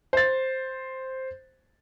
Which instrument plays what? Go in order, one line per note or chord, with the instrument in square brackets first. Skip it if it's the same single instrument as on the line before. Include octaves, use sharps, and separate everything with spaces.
[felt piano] C5 A6